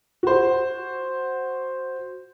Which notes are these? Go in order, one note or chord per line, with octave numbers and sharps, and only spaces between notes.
F#4 C5